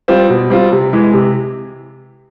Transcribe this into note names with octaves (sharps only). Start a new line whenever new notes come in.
G3 C4 F4
B2
G3 C4 F4
C3
E3 G#3
C3